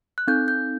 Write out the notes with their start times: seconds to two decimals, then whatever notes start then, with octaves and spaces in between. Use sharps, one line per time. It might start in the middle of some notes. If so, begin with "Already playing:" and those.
0.18 F#6
0.27 C4 D#4 A4 G6
0.48 G6